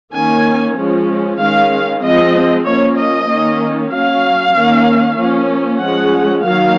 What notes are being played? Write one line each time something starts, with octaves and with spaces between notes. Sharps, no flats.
D#3 A#3 C#4 G#5
F3 G#3 C#4
D#3 G#3 C#4 F5
F3 G#3 C4 D#5
F3 A#3 C#4 C#5
D#5
D#3 A#3 C#4
F#3 C#4 F5
D#3 A#3 C#4
F3 A#3 C#4
F3 G#3 C#4 F#5
D#3 F#3 A#3 F5